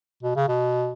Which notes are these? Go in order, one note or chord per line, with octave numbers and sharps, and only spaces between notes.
B2
C#3
B2